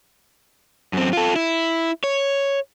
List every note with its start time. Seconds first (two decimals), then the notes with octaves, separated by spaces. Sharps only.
0.93 F#2 C4
1.13 F4 A4
1.36 E4
2.04 C#5